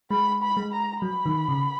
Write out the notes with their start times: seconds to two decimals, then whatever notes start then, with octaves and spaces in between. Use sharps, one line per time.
0.11 G#3 B5
0.42 B5
0.57 G#3
0.72 A#5
1.02 F#3 B5
1.26 D#3
1.48 C#3